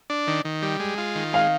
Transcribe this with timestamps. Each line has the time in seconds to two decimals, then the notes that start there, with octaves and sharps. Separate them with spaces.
0.10 D4
0.27 D#3
0.45 D#3
0.62 G3
0.80 G#3
0.98 F4
1.15 D#3
1.33 G#3 F5